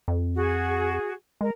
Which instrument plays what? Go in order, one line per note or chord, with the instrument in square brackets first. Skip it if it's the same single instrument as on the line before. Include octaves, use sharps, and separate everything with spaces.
[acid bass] F2
[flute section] F#4 G#4
[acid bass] G#3 [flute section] A#4